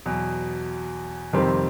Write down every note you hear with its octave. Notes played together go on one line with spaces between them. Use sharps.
E2 B2 F#3
F2 C3 D#3 G3 C4